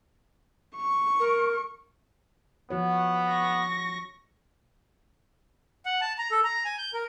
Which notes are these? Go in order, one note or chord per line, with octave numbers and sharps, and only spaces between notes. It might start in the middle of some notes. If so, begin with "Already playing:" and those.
C#6
A#4
F3 B3 F#4 C#5
C#6 A#6
F#5
A5
A#5
A4
A#5
G#5
G6
A#4